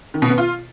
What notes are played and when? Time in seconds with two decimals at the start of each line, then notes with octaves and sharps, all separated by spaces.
0.14 D#3
0.22 B2
0.30 B3
0.38 F4